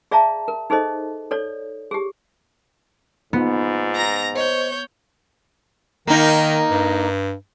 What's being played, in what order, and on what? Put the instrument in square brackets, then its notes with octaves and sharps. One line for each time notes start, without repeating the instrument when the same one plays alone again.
[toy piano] G#4 D5 E5 F5 A5 A#5
A#4
D#4 G#4 A4 C5 D#5
A4 C#5 D5
G4 G#4
[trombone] G#2 [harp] B3 [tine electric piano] D#4 F4
[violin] A#5 A#6
[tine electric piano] C5 D#5 [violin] C#5 G6
[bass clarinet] D#3 [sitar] A#3 D#4
[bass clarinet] G2